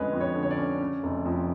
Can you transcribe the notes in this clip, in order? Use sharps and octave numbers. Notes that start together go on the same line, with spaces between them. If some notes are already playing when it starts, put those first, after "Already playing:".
Already playing: F2 D3 G#3 C#4 B4 C#5
F2
C#5
D3
C#5
D5
C#4
C#3
F1
F2